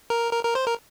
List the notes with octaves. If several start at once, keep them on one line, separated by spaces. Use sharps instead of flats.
A#4
A#4
A#4
C5
A#4